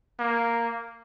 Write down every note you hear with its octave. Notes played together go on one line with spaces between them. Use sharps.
A#3